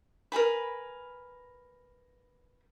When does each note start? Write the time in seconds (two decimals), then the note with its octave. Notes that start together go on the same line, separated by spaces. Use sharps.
0.32 A#4 B4 G#5 B5